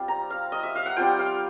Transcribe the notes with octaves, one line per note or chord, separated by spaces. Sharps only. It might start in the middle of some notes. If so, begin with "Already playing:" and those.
Already playing: G3 C4 F4
A#5
F5
D#5
E5
F5
F#5
G3 C4 F4 G5
F5